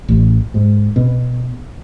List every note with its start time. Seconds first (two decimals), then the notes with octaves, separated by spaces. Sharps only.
0.08 A1
0.54 G#2
0.96 B2